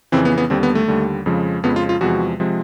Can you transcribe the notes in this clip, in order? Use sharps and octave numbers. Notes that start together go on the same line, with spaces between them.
F2 C#3 E3 C4
B3
B3
D#2 D3 G3 C4
B3
A3
D#2 D3 G3
F2 C#3 F3 G#3
F2 C#3 F3 G#3 B3
F4
F4
E2 C3 F3 G#3 F#4
C3 F3 G#3